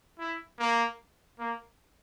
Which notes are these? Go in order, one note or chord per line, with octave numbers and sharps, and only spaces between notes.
E4
A#3
A#3